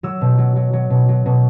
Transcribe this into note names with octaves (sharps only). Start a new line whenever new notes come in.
F#3 E6
B2
F#3
F#3
F#3
B2
F#3
B2